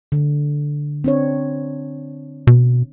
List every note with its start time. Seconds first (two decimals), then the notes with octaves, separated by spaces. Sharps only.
0.12 D3
1.04 C4 D4 C#5
2.47 B2